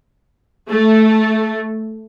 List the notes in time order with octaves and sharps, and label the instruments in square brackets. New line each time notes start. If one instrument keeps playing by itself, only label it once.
[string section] A3